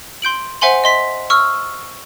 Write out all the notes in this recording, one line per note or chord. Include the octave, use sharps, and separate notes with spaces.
C6 G6 D7 F#7
C5 E5 F#5 G#5 C6 F#7
D#5 C6 B6
C#6 E6 F6